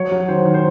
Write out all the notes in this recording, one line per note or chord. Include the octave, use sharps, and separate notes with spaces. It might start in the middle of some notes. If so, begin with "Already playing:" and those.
Already playing: F#3 C#5
F#3
D#3 C5
D#3
C5